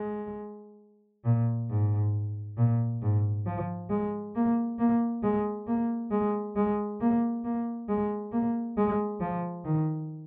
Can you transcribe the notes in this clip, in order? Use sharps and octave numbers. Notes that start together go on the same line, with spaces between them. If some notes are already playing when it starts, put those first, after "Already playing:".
Already playing: G#3
A#2
G#2
A#2
G#2
F3
G#3
A#3
A#3
G#3
A#3
G#3
G#3
A#3
A#3
G#3
A#3
G#3
F3
D#3